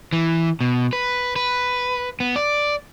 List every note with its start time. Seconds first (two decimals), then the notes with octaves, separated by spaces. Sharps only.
0.13 E3
0.61 B2
0.93 B4
1.36 B4
2.20 B3
2.36 D5